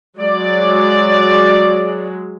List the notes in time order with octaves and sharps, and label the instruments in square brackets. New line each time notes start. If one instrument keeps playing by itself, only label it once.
[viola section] F#3 G#3 [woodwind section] D5